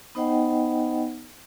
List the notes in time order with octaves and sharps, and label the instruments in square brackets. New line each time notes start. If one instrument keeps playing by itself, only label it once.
[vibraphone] B3 D#4 C5 D#5 F#5 G5